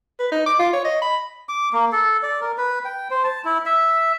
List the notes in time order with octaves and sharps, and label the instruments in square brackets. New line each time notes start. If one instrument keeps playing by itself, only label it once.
[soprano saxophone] B4
D#4
D6
F4
C#5
D#5
B5
[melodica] D6
A#3
A4
D5
A#4
B4
G5
C5
A5
E4
E5